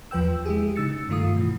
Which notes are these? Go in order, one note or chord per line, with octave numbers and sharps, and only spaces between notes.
E2 F3 B4 G5 E6
G#3 E4 G4 G#4
C#3 D#4 E6 A6 C#7
G2 D#3 A3 F4 D#6
B2 E3